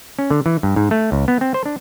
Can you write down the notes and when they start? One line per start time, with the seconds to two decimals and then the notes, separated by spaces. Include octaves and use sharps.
0.19 C#4
0.31 D3
0.46 E3
0.63 G2
0.76 G#2
0.91 A3
1.12 C#2
1.28 B3
1.41 C4
1.54 C5
1.66 D4